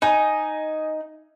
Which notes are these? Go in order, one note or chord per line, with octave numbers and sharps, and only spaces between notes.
D#4 G#5